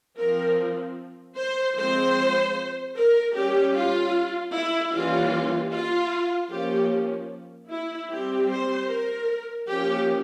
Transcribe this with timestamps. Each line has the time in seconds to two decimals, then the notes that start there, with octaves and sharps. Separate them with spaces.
0.18 F3 C4 A#4
1.38 C5
1.77 F3 G#3 C4 C5
2.96 A#4
3.35 G3 C#4 G4
3.75 F4
4.54 E4
4.93 E3 G3 A#3 C#4 F4
5.72 F4
6.51 F3 A#3 C#4 G4
7.70 E4
8.09 G3 C4 G4
8.49 C5
8.88 A#4
9.67 F3 A#3 C#4 G4